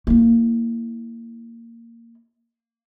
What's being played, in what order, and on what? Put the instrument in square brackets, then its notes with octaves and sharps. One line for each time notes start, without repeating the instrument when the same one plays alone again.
[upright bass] A#3 E4